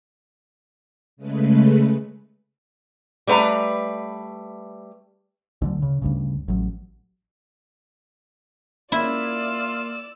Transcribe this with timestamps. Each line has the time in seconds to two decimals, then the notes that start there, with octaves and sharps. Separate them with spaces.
1.17 C#3 G#3 A3 B4
3.27 G3 A3 B4 F#5 A#5
5.62 D2 D3 F#3
5.82 C#3
6.02 D2 G2 C#3
6.48 A1 F#3
8.92 A#3 E4 F4 D5 E6